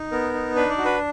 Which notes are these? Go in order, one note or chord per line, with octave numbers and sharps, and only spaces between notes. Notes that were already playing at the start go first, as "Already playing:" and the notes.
Already playing: D#4
B3 A#4
D#4
D4 B4
D5
F#4
B4